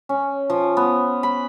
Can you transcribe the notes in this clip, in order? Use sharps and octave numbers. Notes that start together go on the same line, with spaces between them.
C#4
F3
B3
B5